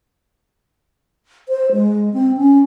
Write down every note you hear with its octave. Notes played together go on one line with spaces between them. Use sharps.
C5
G#3
C4
C#4